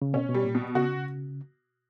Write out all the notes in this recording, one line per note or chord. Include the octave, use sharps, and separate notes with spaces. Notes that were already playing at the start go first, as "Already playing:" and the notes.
C#3
B2 C#4
B2
G3
A#2
B2
C#3 F#4